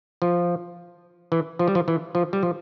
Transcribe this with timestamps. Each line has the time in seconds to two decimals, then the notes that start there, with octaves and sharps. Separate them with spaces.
0.22 F3
1.32 E3
1.59 F3
1.68 G3
1.75 F3
1.88 E3
2.15 F3
2.33 G3
2.43 F3